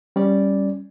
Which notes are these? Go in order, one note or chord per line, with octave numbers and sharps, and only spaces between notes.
G3 C#4 D5